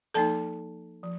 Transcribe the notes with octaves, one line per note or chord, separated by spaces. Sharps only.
F3 A#3 D#4 A4 A5
F3